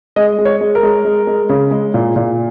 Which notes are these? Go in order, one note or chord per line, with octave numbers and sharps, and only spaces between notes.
G#3 D#5
G#3
C#5
G#3
A#4
G#3
G#3
G#3
C#3
G#3
A#2
A#2